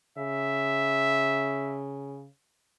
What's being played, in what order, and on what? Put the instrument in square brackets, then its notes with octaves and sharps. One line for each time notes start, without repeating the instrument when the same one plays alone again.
[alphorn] C#3 [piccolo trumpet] E5